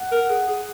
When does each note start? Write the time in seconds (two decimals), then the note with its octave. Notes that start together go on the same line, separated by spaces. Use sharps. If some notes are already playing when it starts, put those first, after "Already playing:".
Already playing: F#5
0.12 A#4
0.30 G#4
0.48 G#4